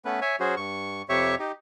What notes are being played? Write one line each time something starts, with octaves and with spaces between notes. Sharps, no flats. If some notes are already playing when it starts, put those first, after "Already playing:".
A3 B3 C#4 B4
C#5 E5 G#5
F#3 C#4 F#4 G#4 C5
G2 C#6
F2 C3 G4 C#5 E5 C#6
D#4 G4